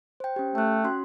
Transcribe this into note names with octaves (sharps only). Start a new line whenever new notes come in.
C5 G5
C#4 G4
A3 G5 F#6
C#4 F#4 C6